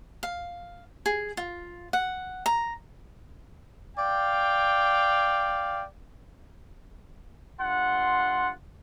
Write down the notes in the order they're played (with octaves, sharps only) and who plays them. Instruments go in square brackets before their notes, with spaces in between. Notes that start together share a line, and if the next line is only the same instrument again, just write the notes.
[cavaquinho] F5
G#4
F4
F#5
A#5
[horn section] D5 F5 G5
G2 F4 F#5 C6